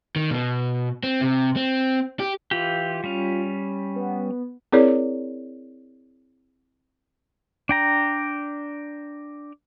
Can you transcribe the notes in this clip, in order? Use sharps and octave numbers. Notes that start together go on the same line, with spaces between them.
D#3
B2
C4
C3
C4
G4
E3 F4 G4
G3 C#4
B3
C4 E4 G#4 A#4 C#5 D5
D4 G5 A#5